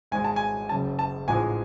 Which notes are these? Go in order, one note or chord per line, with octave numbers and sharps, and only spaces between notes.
G#1 G#2 G#3 G#5
A5
G#5
F#1 F#2 C#3 A5
A5
A1 G#2 F3 G#3 G#5